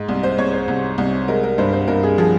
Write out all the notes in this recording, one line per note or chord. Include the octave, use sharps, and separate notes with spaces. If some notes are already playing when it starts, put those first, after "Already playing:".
Already playing: G#2
C2
C5
C2 C#5
C5
C2
C2
G#3 A#4
A#4
G2 C5
C5
G2 A#4
G#4
F3 G#4